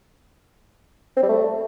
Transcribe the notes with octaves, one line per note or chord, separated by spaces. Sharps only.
C4
G3
A3